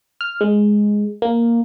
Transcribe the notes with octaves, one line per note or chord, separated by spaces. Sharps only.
F6
G#3
A#3